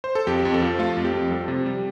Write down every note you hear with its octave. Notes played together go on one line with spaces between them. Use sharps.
C5
A4
F2 G4
F2
A4
F3
A3 F4
F2
G4
F2
G3 A4
C3
G3